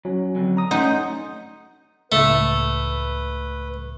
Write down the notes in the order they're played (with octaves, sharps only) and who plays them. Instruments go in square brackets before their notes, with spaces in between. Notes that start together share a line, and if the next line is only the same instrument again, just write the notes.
[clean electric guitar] F#2 [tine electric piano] F#3
[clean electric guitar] F2 D3
[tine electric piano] A#5 D#6
[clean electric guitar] A3 B3 C#4 [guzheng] D#4 [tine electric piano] F#5 C6 G6
[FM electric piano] C#2 A2 [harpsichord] A3 [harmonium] B4